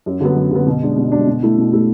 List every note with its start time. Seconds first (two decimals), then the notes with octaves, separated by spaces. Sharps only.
0.06 F#2
0.20 D3 F#3 B3
0.36 F#2
0.51 D3 F#3 B3
0.67 B2
0.81 G#3 D4
0.97 B2
1.12 G#3 D4
1.27 B2
1.43 A3 E4
1.58 B2
1.73 A3 E4